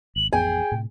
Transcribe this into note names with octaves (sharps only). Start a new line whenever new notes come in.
G#1 F#7
A1 F2 B3 G#4 G5 G#5
A2 C3